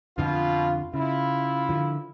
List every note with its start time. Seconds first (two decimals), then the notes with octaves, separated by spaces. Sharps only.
0.18 F2 B2 D3 F3 F4
0.94 C#3 E4 F4
1.69 D3 F3